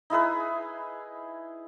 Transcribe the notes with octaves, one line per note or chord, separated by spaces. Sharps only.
D#4 E4 G#4 B4